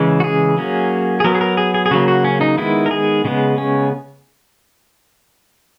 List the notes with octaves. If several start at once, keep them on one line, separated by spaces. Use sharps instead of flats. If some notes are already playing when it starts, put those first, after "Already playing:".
Already playing: C#3 E3 G#3 C#4
F#4
G#4
F#3 A#3 C#4
G#4
F#3 B3 A#4
G#4
A#4
G#4
G#4
G#4
C#3 F#3 A#3 F#4
F#4
C#4
D#4
D#3 G#3 B3 E4
A#4
G#4
C#3 G#3 B3
C#4